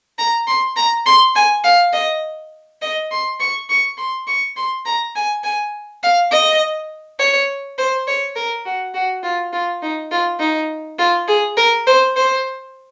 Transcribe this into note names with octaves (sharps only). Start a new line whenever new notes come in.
A#5
C6
A#5
C6
G#5
F5
D#5
D#5
C6
C#6
C#6
C6
C#6
C6
A#5
G#5
G#5
F5
D#5
C#5
C5
C#5
A#4
F#4
F#4
F4
F4
D#4
F4
D#4
F4
G#4
A#4
C5
C5